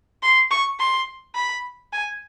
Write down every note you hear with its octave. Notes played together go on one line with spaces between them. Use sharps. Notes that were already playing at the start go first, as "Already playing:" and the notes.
C6
C#6
C6
B5
G#5